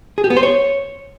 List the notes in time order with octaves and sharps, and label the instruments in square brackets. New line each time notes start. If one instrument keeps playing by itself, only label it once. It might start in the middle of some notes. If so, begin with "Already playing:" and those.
[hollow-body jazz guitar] G#4
G4
B3
C5
C#5